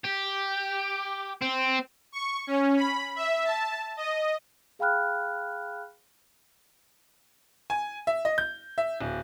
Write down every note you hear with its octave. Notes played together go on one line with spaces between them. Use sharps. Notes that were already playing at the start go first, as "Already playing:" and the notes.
G4
C4
C#6
C#4
B5
E5
A5
D#5
G#4 F5 G5 B5 F6 F#6
G#5
E5
D#5
G6
E5
D1